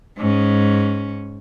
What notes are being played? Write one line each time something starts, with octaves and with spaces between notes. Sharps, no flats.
G#2 C#4